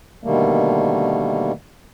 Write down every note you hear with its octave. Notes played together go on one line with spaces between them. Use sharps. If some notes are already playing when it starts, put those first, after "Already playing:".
B2 D3 D#3 G3 A3 A#3